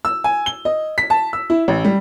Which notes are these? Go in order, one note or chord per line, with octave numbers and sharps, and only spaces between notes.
E6
G#5
G7
D#5
B6
A5
E6
E4
A1
G3